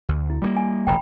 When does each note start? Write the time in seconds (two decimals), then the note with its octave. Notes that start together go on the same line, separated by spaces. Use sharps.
0.09 D2
0.30 E4
0.42 G3 G#3 A#3 F4
0.57 G#5
0.87 E1 A1 G5 A#5 B5